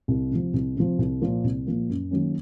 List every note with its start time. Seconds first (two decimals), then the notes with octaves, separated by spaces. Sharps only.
0.08 C2
0.31 C3 F3
0.53 C2
0.76 C3 F3
0.99 C2
1.21 A#2 F3 A#3
1.44 C2
1.67 A#2 F3 A#3
1.89 F#2
2.11 D#3 F#3 A#3 C#4